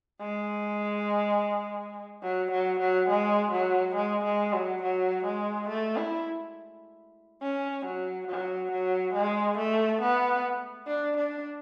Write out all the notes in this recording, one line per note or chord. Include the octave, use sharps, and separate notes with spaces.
G#3
F#3
F#3
F#3
G#3
F#3
G#3
G#3
F#3
F#3
G#3
A3
E4
C#4
F#3
F#3
F#3
G#3
A3
B3
D4
D4